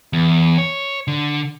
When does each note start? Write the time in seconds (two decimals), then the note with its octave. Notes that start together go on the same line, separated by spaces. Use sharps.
0.13 E2
0.58 C#5
1.08 D3